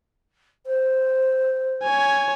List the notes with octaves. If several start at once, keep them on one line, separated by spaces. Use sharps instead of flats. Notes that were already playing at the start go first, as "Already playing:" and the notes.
C5
C#5 G#5